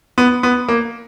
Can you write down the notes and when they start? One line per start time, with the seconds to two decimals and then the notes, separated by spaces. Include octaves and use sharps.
0.18 B3
0.43 B3
0.69 A#3